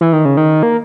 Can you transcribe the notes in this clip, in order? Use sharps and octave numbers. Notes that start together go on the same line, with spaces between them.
E3
D#3
C#3
D#3
A#3